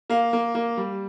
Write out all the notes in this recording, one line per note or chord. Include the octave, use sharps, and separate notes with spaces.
A#3 F5
A#3
A#3
G3